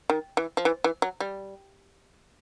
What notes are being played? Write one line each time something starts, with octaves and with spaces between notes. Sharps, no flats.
D#3
E3
F3
E3
E3
F#3
G3